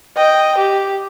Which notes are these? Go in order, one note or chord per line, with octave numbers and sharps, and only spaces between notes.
D#5 G5
G4